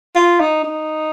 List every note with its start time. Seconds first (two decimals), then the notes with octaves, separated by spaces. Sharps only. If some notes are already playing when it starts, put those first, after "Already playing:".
0.16 F4
0.40 D#4
0.64 D#4